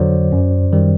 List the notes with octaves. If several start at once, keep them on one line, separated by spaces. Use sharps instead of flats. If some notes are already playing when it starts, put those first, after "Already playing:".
Already playing: F2 D3 F#3 C5 D5
F#2
D#3 G3